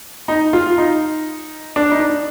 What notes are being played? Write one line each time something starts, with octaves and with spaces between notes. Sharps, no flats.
D#4
F4
D#4
D4
D#4
D4